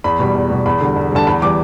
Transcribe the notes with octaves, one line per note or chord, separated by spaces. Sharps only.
E2 B5
B2 G3
E2
B2 G3
E2 B5
D3 G3
E2
D3 G3 A5
E2 B5
E3 G3 D6